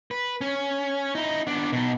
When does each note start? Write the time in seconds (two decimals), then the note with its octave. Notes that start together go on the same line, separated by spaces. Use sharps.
0.11 B4
0.41 C#4
1.15 D#4 E4
1.47 B3 D4
1.73 B2 D#4